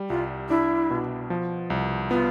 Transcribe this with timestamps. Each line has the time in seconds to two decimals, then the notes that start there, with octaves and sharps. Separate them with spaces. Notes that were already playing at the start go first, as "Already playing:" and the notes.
Already playing: G3
0.09 C2 F4
0.49 D4 E4
0.90 B2
1.30 F3
1.70 C2
2.10 B3 F4